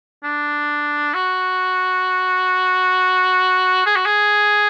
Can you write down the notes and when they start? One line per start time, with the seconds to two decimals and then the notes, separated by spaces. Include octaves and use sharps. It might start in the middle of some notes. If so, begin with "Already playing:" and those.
0.24 D4
1.14 F#4
3.86 G#4
3.96 F#4
4.06 G#4